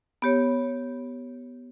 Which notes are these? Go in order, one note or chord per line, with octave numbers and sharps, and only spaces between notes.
B3 G4 C#5